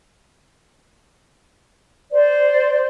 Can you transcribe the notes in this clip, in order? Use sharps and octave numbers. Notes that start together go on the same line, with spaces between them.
C5 D5